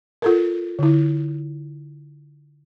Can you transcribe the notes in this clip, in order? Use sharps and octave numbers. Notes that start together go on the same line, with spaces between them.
F4 A4 A#4
D3 E4